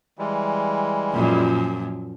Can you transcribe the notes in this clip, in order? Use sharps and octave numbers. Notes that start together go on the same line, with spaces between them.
E3 G3 G#3
F#2 A#2 F3